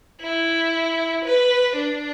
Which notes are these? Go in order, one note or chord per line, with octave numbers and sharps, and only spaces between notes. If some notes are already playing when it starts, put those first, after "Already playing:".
E4
B4
D4